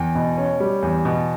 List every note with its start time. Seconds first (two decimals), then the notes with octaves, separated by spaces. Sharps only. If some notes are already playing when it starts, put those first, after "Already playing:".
Already playing: E2 G5
0.15 B2
0.38 C#4
0.60 G3
0.82 E2
1.05 B2